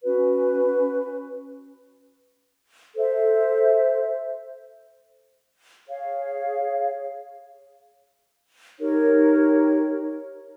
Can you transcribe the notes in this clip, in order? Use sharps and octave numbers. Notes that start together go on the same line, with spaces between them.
C#4 F#4 B4
A4 C5 E5
G#4 C#5 F5
D#4 G4 A#4 C#5